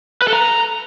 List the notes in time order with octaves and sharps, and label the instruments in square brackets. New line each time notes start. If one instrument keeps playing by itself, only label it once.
[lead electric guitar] B4
A4
A#5